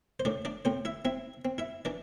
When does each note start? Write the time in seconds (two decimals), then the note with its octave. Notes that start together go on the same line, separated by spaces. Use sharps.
0.20 C5
0.25 A2 D4 D5
0.45 D4 D5
0.65 A2 C4 C5
0.85 E4 E5
1.05 C4 E4 E5
1.45 C4
1.58 E4 E5
1.85 E3 D4 D5